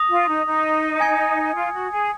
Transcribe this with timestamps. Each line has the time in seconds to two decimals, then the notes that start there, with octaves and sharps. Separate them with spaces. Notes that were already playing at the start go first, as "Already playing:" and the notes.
Already playing: D#6 A#6 F7
0.10 F4
0.28 D#4
0.46 D#4
1.00 G#5 D#6 G#6 C#7
1.55 F4
1.73 F#4
1.91 G#4